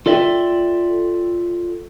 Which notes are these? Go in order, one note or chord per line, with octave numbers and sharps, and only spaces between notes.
F4 A4 D5 E5 G5